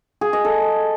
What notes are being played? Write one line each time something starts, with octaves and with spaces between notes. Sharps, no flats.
G#4
D#5
A4